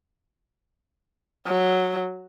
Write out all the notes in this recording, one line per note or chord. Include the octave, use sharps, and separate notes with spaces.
F#3